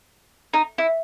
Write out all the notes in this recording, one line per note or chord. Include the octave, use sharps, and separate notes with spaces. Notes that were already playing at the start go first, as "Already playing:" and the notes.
D#4
E4